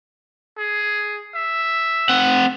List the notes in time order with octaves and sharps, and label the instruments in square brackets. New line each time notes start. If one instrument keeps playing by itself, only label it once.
[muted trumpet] G#4
E5
[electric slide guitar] C4 F#5